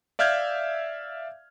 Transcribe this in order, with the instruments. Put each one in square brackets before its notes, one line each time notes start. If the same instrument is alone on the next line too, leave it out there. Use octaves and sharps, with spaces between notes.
[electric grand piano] D5 E5 F5 F6 G6 G#6